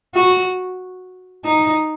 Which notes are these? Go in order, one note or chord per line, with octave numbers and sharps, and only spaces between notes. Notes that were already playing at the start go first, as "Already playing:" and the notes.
F#4
D#4